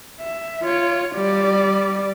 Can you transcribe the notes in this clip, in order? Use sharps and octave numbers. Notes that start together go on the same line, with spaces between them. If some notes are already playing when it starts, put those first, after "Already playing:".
E5
F4 C#5
G3 D5